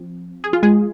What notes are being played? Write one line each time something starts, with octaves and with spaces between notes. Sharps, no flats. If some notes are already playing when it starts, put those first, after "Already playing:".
Already playing: F3 C4
G#4
F4
G#3 G#4